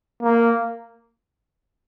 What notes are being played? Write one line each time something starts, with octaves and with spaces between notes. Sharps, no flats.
A#3